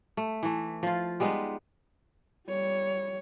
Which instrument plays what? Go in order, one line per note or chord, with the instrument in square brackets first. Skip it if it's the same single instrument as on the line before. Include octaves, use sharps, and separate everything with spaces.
[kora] A3
E3 A3
F3 F4
G3 G#3 B3 D#4
[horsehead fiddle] G3 C#5